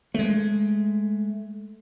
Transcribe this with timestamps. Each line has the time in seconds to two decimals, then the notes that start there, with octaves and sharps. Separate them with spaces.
0.14 G#3 A3